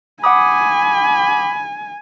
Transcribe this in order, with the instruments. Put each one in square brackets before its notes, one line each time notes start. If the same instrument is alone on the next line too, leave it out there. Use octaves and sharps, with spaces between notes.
[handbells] F#5 D6 D#6 [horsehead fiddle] G#5 [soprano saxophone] B5